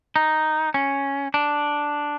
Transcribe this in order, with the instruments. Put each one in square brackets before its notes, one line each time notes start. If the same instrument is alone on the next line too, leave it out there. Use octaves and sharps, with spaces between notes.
[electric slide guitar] D#4
C#4
D4